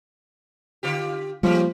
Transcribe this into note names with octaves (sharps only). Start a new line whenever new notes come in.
D3 F4 G4
F3 G3 G#3 A#3 C#4 G4